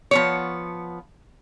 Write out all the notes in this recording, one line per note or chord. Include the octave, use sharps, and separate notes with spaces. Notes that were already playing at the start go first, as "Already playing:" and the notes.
F3 B3 C#5